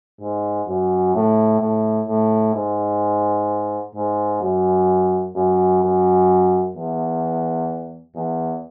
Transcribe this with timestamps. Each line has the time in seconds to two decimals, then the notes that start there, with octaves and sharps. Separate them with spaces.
0.21 G#2
0.68 F#2
1.15 A2
1.60 A2
2.08 A2
2.55 G#2
3.95 G#2
4.41 F#2
5.35 F#2
5.82 F#2
6.75 E2
8.16 E2